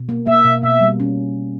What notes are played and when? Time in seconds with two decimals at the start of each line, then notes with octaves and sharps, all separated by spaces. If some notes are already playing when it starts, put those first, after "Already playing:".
Already playing: B2
0.09 A#3
0.27 A#3 E5
0.45 B2
0.63 B2 E5
0.81 G3
1.00 C#4